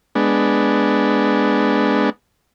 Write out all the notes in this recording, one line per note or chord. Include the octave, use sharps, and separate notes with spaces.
G#3 B3 D4